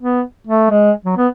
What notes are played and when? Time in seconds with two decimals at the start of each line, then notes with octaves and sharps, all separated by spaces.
0.01 B3
0.47 A3
0.70 G#3
1.05 F#3
1.17 B3